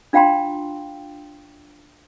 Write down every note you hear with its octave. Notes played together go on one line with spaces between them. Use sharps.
D4 F4 F5 G5 A#5 C6